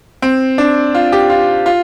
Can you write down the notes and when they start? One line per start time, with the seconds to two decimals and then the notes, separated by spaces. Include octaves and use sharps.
0.22 C4
0.58 D4
0.95 F4
1.12 G4
1.30 F4
1.66 F4